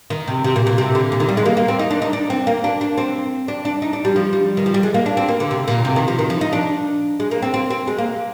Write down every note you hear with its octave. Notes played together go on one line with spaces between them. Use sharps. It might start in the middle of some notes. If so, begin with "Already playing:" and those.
D#3
C3
C3
A#2
A#2
C3
D3
A#2
D#3
G3
G#3
A#3
A#3
C4
D#4
D4
D#4
D4
C4
A#3
D4
D4
C4
D4
D4
D#4
D4
G3
F3
G3
D#3
F3
G3
G#3
A#3
D4
C4
A#3
D3
C3
A#2
C3
D#3
F3
D#3
F3
D#4
D4
G#3
A#3
C4
C4
C4
G#3
A#3